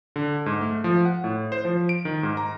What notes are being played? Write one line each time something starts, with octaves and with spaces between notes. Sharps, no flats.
D3
G#2
A3
F3
F#5
A2
C5
F3
D7
D#3
G#2
A#5